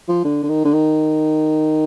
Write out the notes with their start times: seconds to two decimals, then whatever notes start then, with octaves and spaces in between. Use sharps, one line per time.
0.09 F3
0.25 D3
0.43 D3
0.49 D#3
0.65 D3
0.73 D#3